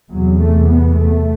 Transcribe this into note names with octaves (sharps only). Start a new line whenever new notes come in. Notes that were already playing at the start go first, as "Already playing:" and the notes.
E2 C3 F#3
A3
B3
A3